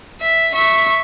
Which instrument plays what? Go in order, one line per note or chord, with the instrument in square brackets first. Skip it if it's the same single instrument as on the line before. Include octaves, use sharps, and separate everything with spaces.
[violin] E5
[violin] E5 [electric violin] C#6